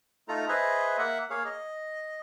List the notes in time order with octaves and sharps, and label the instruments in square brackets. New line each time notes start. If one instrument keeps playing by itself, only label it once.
[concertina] A3 D#4 F4 A4 A#5
G#4 B4 C5 D#5 E5
A#3 E5 F#5
A#3 G#4 C#5 F5
D#5